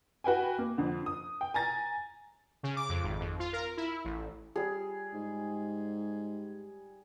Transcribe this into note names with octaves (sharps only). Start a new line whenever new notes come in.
F#4 B4 G5 G#5
A#3
F2 D3
D#6
G5
G#5 A#5 A6 A#6
C#3
D6
F2
G#1
F2
F4
A#4
E4
A1
G3 G#4
G#2